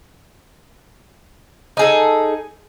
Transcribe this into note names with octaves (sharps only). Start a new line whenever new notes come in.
D#4 G#4 A4